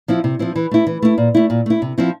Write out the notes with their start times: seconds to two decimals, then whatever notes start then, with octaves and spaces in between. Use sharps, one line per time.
0.08 F3 C4 E4
0.24 C3
0.39 F3 C4 E4
0.56 E3
0.71 A3 E4
0.87 E3
1.02 A3 E4
1.18 A#2
1.35 A3 E4
1.50 A#2
1.66 A3 E4
1.82 C3
1.98 F3 C4 E4